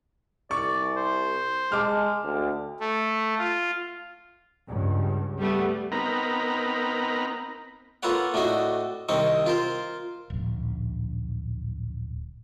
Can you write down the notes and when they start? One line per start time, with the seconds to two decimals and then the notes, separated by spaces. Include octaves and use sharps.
0.51 C2 D5 C#6
0.97 C5
1.72 G#3 A5 D6 F6
2.25 D2
2.80 A3
3.39 F4
4.68 C#2 G2
5.40 G3 A3 B3
5.92 B3 C4 D#4 A#4 A#5 B5
8.03 A#3 F4 A4 B4 C#5 F#5
8.34 A2 A3 D4 F#4 D#5
9.09 C2 D#3 C4 D#5 C#6
9.46 F4 A#4 C5
10.30 D1 A#1